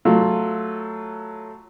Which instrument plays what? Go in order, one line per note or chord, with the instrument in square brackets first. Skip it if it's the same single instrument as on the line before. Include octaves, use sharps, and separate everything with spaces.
[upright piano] F#3 A3 F4